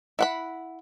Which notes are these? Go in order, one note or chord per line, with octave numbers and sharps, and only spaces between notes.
E4 F#5 B5